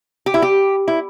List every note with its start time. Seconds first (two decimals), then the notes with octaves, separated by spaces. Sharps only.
0.26 G4
0.34 E4
0.42 G4
0.88 E4